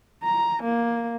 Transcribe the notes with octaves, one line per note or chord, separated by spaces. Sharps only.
A#5
A#3